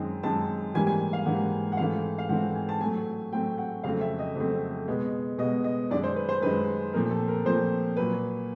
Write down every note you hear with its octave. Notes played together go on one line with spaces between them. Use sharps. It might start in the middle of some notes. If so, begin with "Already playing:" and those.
Already playing: F#2 D#3 G#3 C4
F#2 D#3 G#3 C4 A5
G#2 E3 G3 A#3 G#5
G#5
F5
G#2 E3 G3 A#3 F#5
F#5
G#2 E3 A3 C4 F5
F5
G#2 E3 A3 C4 F#5
G#5
A5
A2 F#3 A3 C4 G#5
A2 F#3 A3 C4 G5
F#5
F2 C#3 F#3 A3 C4 F5
E5
D#5
F2 C#3 F#3 A3 C4
B2 G#3 B3
B2 G#3 B3 D#5
D#5
F#2 D#3 G#3 D5
C5
B4
C5
F#2 D#3 G#3 B4
A#2 F3 A3 C4 A#4
A4
A#4
A#2 F3 A3 C4 C5
A#2 F#3 A#3 B4